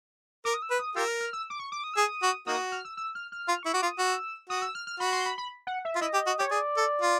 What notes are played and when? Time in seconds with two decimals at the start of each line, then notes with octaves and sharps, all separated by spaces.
0.45 A#4 D6
0.54 D#6
0.62 E6
0.70 B4
0.79 D#6
0.96 F4 G4 A#4 E6
1.08 F6
1.21 F6
1.33 E6
1.50 D6
1.59 C#6
1.72 D6
1.84 D#6
1.94 G#4 E6
2.05 D#6
2.22 F#4
2.47 A#3 D#4 F#4 D#6
2.72 F6
2.85 E6
2.97 E6
3.15 F6
3.32 F6
3.48 F4
3.63 E4 C#6
3.74 F#4 D6
3.82 F4
3.87 D#6
3.98 F#4 E6
4.49 F#4 D#6
4.62 E6
4.75 F6
4.87 F6
5.00 F#4 B5
5.13 C6
5.26 B5
5.38 B5
5.67 F#5
5.85 E5
5.96 F4
6.01 E4 D#5
6.14 G4
6.27 F#4
6.39 G4 C#5
6.51 G#4 D5
6.77 A4
7.02 F4